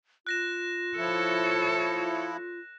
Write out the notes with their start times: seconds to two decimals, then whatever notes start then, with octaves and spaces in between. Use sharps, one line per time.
0.27 F4 F#6 A#6 E7
0.97 F3 E4 A4 C#5